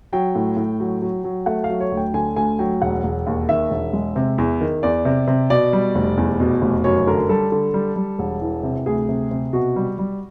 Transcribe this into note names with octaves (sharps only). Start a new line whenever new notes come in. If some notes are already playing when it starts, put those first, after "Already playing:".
F#3 G5
A2
A2
F#3
F#3
F#3
A3 F#5
F5
F#3
C#5
D2
G5
D3 G#5
D2 G#5
F#3 G5
E1 F#5
E1
D#2
D#3 E5
E1
G#3
C3
E2
D#3
E2 D5
C3
C3
B2 D5
G3
F1
E2
B2
F1
F#2 C#5
D3 A#4
G3 A4
D3
G3
G3
E1
E3
C3
D2 G#4
C3
C3
B2 F#4
G3
G3